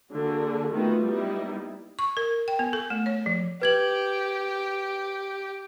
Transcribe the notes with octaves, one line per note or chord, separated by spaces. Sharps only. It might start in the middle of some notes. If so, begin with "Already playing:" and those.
D3 A#3 F#4 G#4
D#3 A3 B3 F4 F#4 B4
G3 A#3 B3 D#4 E4
C#6
A#4
G5
B3
A4
A3
C#5
F3
G4 B4 G#6 F#7